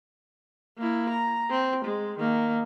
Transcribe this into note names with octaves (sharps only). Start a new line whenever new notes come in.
A#3 E4
A#5
C4
G#3
D#3 A#3